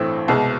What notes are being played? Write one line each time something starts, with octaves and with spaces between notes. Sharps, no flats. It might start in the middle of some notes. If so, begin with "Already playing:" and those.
Already playing: A1 G2 E3 A3 C4
C2 B2 G#3